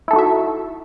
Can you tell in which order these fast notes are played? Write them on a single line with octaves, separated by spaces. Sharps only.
E4 A4 D#4 F#4 E5